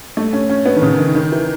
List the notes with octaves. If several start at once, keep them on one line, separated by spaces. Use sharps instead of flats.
A3
C#4
C#4
B3
D#3
C#3
D#3
D#3
E3